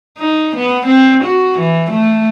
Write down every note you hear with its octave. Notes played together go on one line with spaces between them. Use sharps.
D#4
B3
C4
F#4
E3
A3